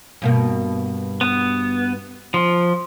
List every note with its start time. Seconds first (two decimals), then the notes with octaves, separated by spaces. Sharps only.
0.22 G2 B2 A#3
1.21 B3
2.34 F3